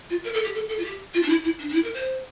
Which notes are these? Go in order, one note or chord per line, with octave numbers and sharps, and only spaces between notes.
F4
A#4
A4
G4
A4
A4
F4
G4
F4
D4
E4
E4
D4
D4
E4
A#4
C5